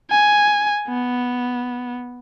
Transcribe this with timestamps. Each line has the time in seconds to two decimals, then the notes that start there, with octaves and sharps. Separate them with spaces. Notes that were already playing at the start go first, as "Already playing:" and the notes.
0.11 G#5
0.89 B3